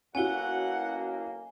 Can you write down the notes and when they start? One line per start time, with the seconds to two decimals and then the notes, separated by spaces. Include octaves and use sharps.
0.15 B1 A#3 C#4 E4 F#4 F#5 G#5 G7